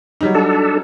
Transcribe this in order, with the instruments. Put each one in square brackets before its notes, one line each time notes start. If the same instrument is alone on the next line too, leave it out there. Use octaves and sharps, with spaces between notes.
[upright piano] F#3 G3 D#4
[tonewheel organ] D4 A4